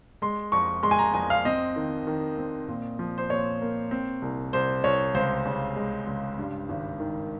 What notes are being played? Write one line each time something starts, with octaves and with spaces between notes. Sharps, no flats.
G#3 C6
F2 C#6
G#3 C6
G#5
A#5
F2 G#5
F5
C4 D#5
D#3
D#3
C4
A#2
F3
C5
A#2 C#5
A#3
C4
C2
C2 C5
C2 C#5
C#2 C5
C#3
G#3
C#2
G2
G#1
D#3